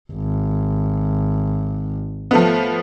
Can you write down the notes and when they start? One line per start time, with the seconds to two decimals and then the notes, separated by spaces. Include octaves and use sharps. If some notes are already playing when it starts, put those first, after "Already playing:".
0.12 G#1
2.31 F3 A3 B3